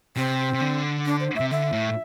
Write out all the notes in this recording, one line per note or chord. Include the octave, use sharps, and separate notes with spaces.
C3 C4
C3
D3
D4
C5
C3 E5
D3 E5
A2